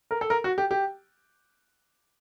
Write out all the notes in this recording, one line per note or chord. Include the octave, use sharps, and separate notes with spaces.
A#4
A4
A#4
F#4
G4
G4